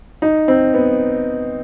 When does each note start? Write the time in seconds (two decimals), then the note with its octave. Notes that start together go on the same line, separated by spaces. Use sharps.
0.22 D#4
0.48 C4
0.74 B3